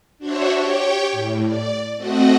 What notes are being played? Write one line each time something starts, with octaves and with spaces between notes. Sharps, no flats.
D4 F#4 C5 C#5 E5
G4 C#5 G5
A2
D5
A3 C4 F#4 D#5 F#5